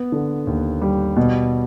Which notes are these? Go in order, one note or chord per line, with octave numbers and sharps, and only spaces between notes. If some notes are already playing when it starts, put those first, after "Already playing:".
Already playing: B3
D3
D#2
G3
B2